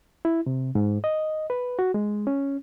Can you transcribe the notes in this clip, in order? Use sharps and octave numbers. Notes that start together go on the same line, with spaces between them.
E4
C3
G#2
D#5
B4
F#4
G#3
C#4